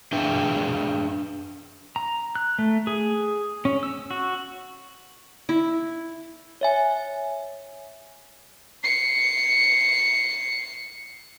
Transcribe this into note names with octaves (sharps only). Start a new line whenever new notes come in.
D4 G#4 B4 E5 G5
A#5
F#6
A3
G#4
C#4
E6
F#4
E4
C#5 E5 G#5
C7 C#7